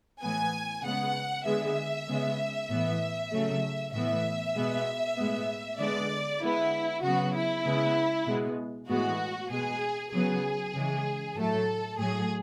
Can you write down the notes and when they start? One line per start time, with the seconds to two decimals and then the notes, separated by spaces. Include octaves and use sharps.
0.21 A2 E3 B3 G#5
0.83 C#3 G#3 B3 F#5
1.45 D3 G#3 B3 E5
2.08 C#3 G#3 B3
2.70 A2 E3 B3
3.31 C#3 F#3 A3
3.93 A2 E3 B3 E5
4.55 B2 G#3 B3
5.16 A2 G#3 B3
5.79 D3 G#3 B3 D5
6.40 D3 G#3 B3 E4
7.02 C#3 F#3 B3 F#4
7.34 E4
7.65 C#3 G#3 B3
8.26 B2 G#3 B3
8.88 A2 E3 G#3 B3 F#4
9.50 B2 G#3 B3 G#4
10.12 C#3 F#3 B3 G#4
10.74 C#3 E3 G#3
11.36 A2 F#3 A3 A4
11.98 A2 F#3 A3 G#4